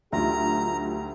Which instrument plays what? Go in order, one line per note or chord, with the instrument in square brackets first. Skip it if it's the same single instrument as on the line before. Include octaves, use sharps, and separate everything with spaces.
[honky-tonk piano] D2 [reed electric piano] F#3 D#4 F4 [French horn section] G4 [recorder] A#5